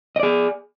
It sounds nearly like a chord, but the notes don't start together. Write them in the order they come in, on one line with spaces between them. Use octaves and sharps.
D#5 D5 G#4